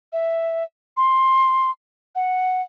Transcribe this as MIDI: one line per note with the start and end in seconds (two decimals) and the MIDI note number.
0.12 0.63 76
0.97 1.71 84
2.15 2.62 78